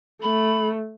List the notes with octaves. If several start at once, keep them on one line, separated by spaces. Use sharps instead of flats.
A3 B5